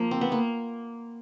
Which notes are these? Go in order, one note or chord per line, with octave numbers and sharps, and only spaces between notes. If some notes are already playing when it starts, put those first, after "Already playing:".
Already playing: F3 A#3
C4
B3
A#3